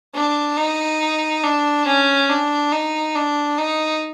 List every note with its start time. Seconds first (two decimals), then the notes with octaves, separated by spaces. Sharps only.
0.14 D4
0.57 D#4
1.44 D4
1.86 C#4
2.29 D4
2.72 D#4
3.15 D4
3.58 D#4